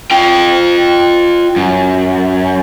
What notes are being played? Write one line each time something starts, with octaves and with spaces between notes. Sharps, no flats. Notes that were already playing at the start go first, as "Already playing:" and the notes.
F4 G5
F#2